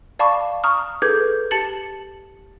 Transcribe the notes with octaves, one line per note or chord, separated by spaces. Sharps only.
D5 F5 A5 B5 C#6 D6
A#5 C#6 D#6 F6
G#4 A4 B4 D6 G6 G#6
G4 A5 A6 C#7 F#7